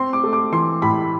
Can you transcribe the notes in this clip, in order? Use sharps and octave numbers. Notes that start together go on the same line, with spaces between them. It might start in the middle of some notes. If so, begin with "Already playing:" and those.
Already playing: C4 C6
D6
A3
D6
E3 C6
A2 B5